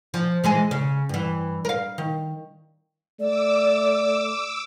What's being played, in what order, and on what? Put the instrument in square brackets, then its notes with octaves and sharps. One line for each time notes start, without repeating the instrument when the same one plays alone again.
[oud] F3
E3 G#3 G#4
C#3
G2 E3
A#4 F5
D#3
[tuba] A3 [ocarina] D5 [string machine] D6 E6